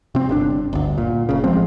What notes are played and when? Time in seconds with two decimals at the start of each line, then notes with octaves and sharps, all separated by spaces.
0.15 C3 C4
0.29 G1 C3 D4
0.73 G1 D2
0.98 A#2
1.29 F#1 C#3
1.44 A1 F3 G#3 C4